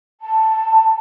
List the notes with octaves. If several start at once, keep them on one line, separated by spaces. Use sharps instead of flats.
A5